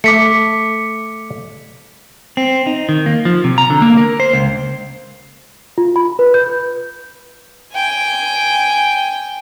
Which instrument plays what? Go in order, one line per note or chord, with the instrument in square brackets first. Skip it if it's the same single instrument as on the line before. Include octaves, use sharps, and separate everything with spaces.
[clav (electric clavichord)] A3 [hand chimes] D6 B6 C#7
[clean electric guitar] C4
D#4
D#3
A#3
F3
C3
A#5
D3
A#3
A#4
C5
C#2
[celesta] F4
B5
B4
G6
[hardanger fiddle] G5 G#5